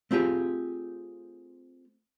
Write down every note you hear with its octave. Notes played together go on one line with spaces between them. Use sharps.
A3 C4 F4 G4 G#4